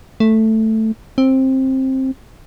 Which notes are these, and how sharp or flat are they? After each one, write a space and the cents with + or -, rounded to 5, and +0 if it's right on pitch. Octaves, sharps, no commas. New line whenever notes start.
A3 +5
C4 +15